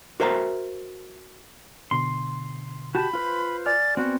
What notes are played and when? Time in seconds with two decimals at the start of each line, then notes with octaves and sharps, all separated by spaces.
0.20 F#4 A#4 C5 E5 G#5 A#5
1.91 B2 D3 C6
2.95 F#4 G4 A5 B5
3.13 F4 B4 C5
3.66 D5 G#5 F6 A6
3.97 B3 C4 F#4